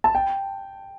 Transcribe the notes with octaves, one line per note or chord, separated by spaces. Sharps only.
A5
G5